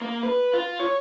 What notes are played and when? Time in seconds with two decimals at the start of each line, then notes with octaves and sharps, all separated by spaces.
0.02 A#3
0.23 B4
0.53 F4
0.80 C#5